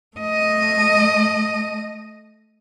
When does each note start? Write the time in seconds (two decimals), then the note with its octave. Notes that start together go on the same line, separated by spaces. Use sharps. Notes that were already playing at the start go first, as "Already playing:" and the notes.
0.17 A3 D#5